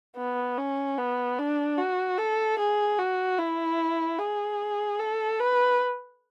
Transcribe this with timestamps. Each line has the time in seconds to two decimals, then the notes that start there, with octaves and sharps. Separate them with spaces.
0.17 B3
0.58 C#4
0.98 B3
1.39 D4
1.78 F#4
2.19 A4
2.59 G#4
2.99 F#4
3.39 E4
4.19 G#4
4.99 A4
5.40 B4